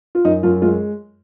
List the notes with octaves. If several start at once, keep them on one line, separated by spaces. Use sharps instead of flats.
F4
F#2 D#4
F#2 F4
G#3 F4